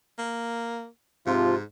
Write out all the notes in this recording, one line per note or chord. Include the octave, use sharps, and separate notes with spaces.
A#3
G#2 C3 F3 F4